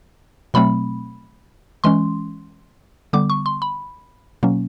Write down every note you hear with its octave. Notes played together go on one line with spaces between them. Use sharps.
B2 F#3 A3 C4 B5
E3 G#3 C#4 C6
D3 G3 B3 D6
C#6
C6
B5
B2 F#3 A#3 C#4